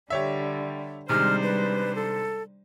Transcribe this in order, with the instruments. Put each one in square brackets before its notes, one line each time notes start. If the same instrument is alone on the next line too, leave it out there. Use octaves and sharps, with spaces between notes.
[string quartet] D3 G3 [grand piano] G4 C#5 E5
[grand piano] C3 D#3 G#3 [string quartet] G3 D4 C5 [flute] F6
[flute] B4
A4